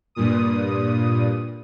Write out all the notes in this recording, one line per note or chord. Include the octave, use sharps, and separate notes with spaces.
G2 A#2 D#6